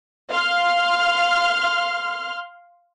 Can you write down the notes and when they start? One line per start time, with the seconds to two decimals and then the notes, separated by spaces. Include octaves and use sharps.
0.30 F5 C6 F6